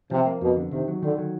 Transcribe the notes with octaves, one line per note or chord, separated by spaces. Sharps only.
C3 F3
A#3
F2 B2
D3
C3 D#3
F#3
D3 D#3
F#3